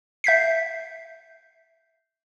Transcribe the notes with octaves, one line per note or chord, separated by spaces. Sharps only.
E5 G6 B6 C7